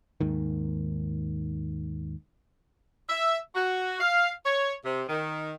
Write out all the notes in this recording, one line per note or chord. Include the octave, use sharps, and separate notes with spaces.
D#2 G#2 D#3
E5
F#4
F5
C#5
C3
D#3